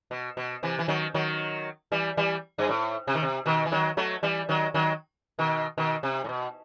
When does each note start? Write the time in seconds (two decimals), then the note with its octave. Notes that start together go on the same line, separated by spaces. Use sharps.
0.11 B2
0.37 B2
0.63 C3 E3
0.79 E3
0.88 D#3 F#3
1.14 D#3 F#3
1.92 E3 G3
2.17 E3 G3
2.58 G2
2.69 A2
3.07 C3
3.15 D#3
3.22 C3
3.46 B2 D#3
3.66 E3
3.72 D#3 F#3
3.97 F#3 A3
4.23 E3 G3
4.49 D#3 F#3
4.74 D#3 F#3
5.39 B2 D#3
5.78 B2 D#3
6.03 C3
6.24 A2
6.29 B2